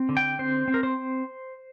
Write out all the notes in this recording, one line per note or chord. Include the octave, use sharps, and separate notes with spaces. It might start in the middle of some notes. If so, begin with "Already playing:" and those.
Already playing: C4
D3
G5
C4 C5
C4
A#4
C5